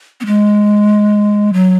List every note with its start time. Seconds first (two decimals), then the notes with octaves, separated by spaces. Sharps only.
0.21 B3
0.26 G#3
1.53 F#3